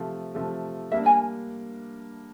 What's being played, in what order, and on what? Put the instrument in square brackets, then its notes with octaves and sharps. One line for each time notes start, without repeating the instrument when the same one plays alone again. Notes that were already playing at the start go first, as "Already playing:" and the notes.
Already playing: [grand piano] C3 F3 A3
C3 F3 A3
[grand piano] G3 A#3 D4 [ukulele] E5
[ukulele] G#5